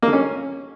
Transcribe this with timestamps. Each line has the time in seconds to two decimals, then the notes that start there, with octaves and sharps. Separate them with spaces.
0.02 A#3
0.08 D3
0.13 C#4